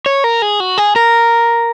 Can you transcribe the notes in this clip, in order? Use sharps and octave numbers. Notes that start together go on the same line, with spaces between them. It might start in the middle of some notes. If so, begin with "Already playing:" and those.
C#5
A#4
G#4
F#4
G#4
A#4